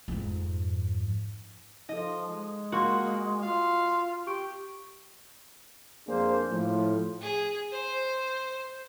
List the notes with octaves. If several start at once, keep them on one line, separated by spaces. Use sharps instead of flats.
F2 G#2
F3 D#4 A4 D#5
G#3
A#3 F#4 F#5 B5 C6
F4 F5
G4 C#6 D7
F2 A#3 D4 G#4 C5
A2 F3
G#4
C5